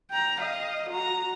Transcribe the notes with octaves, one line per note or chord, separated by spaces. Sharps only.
G5 A#5
D#5 F5
F#4 A#5